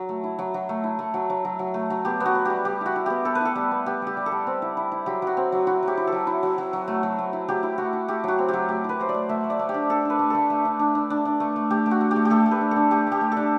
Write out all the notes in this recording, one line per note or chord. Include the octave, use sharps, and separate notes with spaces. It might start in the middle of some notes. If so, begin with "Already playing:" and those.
Already playing: F#3
A3
E4
F#3
F#3
A3
E4
A3
F#3
F#3
F#3
F#3
A3
F#3
B3 G4
B3
F#4
B3
G3 G4
G3 G4
E4 F#4
E4
B3 G4
B3 A4
B4
E4 A4
G3
B3
B3 G4
G3
G4
G3
A4
G3
C4
E4
E4
E4
F#3 G4
F#3 F#4
C4
F#3
E4 F#4
F#3 G4
E4
F#3 A4
E4
F#3
F#3
F#3
A3
F#3
A3
E4
F#3 G4
E4
A3 F#4
E4
A3 G4
F#3 F#4
C4
F#3 G4
A3 G4
E4 B4
F#3 C5
D5
A3
A3 E5
A3
D5
A3
G4
D4
D4 A4
D4 B4
A3
A3 A4
A3
D4
D4
D4
D4
D4
A3
A3
A3 G4
A3
F#4
A3
G4
A3
G4
A3 A4
A3
B4
D4
A4
D4
A3 G4
A3
G4
A3
D4 A4